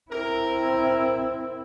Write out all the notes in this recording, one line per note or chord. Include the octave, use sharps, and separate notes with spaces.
C4 E4 A#4